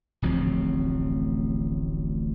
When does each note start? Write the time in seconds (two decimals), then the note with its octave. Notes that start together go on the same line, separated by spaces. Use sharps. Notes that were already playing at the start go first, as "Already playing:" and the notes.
0.22 D1 A1 F3 C4